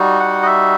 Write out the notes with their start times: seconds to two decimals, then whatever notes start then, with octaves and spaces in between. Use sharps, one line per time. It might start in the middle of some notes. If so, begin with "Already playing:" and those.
Already playing: G3 D#4 F#4
0.20 F#5
0.42 D#5
0.46 E5